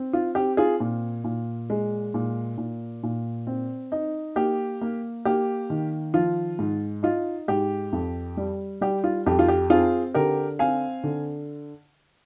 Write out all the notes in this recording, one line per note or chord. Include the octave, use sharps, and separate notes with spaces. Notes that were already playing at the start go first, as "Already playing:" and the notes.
Already playing: C4
F4
C4 G4
F4 G#4
A#2
A#2
G#3
A#2
A#2
A#2
C4
D#4
A#3 G4
A#3
A#3 G4
D#3
F3 F4
G#2
D#4 F4
G#2 G4
F2
G3
G3 G4
F4
F2 G4
F4
G4
C4 F4 G#4
D3 G4 A#4
C4 F5 G#5
D3